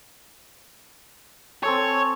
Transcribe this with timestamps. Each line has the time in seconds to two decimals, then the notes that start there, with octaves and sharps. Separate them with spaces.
1.63 C4 A4 C#5 G#5